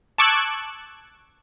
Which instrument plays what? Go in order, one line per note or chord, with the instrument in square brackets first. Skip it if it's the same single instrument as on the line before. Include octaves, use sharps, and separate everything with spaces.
[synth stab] A5 C#6 D6 E6 F#6 G#6